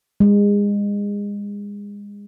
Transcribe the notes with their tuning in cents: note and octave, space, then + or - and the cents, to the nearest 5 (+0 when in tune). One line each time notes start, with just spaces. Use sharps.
G#3 -30